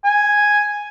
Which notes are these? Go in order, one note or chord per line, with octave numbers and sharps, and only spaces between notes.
G#5